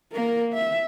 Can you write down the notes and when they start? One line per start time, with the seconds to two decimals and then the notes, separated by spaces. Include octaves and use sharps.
0.13 A#3 A#4
0.54 E5